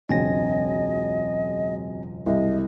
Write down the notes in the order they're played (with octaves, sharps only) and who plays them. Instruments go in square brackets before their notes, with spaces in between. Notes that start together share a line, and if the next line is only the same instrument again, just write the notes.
[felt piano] E1 C#2 F#2 [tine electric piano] C4 G#5 A#6 [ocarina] D#5
[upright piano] C2 [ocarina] D#5